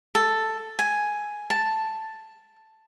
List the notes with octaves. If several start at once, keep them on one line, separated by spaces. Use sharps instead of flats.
A4
G#5
A5